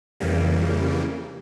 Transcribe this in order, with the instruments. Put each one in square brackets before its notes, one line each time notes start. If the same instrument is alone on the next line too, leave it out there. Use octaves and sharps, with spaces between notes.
[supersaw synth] F2 C#3 E3 G3 A#3